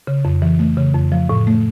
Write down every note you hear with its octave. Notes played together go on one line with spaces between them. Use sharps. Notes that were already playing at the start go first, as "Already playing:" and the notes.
C#3
F2
E3
A3
C#3
F2
F3
A2
A3